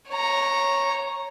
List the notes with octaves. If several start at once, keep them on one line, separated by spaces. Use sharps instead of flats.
C#5 A#5